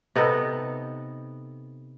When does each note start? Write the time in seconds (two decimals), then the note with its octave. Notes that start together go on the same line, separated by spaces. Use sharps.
0.15 C3 B3 D#4 A4